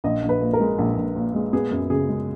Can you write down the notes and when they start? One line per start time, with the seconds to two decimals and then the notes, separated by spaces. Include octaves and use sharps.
0.04 A#1 D#5
0.23 A#1
0.29 B4
0.41 A#2
0.53 A#4
0.60 G#3
0.78 A#1
0.97 A#1
1.16 A#2
1.34 G#3
1.53 B3 G#4
1.71 F#2
1.90 C#3 G#4
2.09 G#3